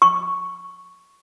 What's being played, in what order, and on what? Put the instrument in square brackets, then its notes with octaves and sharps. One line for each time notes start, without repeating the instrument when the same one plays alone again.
[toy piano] C#6